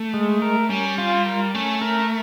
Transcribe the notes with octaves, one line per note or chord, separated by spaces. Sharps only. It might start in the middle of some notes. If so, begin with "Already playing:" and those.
Already playing: A3
G#3
A#4
G3 C#4
F4
A#4
A3 C#4
A#4